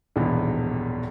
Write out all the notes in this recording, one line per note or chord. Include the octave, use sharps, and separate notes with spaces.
D#1 A#1 G#2 B2 E3